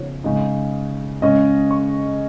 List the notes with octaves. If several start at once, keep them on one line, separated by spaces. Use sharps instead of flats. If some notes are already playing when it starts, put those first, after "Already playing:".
Already playing: C#3 F3 B3 D#4 C#5
C#3 G#3 D#4
C#3 G#3 C#4 D#5
C#6